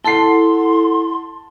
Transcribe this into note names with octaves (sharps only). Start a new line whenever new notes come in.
E4 A4 F#5 A5 C6 C7